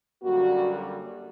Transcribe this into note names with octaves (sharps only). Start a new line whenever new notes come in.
F#2 D3 G3 A#3 F#4